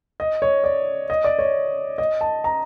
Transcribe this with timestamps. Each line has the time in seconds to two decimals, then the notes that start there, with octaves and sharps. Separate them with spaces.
0.20 D#5
0.42 C#5
0.64 D5
1.10 D#5
1.24 D5
1.39 C#5
1.98 D#5
2.21 A5
2.44 A#5